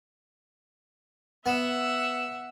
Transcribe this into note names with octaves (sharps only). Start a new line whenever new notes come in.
B3 E5 F#5 E6